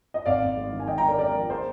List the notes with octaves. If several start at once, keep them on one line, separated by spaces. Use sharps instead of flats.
D#5
G#1 D5 F5
G#1
G#3
D#3
G#5
G#3 D#5 G5
G5 A#5
D3 A#4 D5
G#3 A#4 D5
F3
G#4 C5